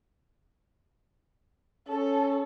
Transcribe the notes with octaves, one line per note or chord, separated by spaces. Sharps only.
C#4 A4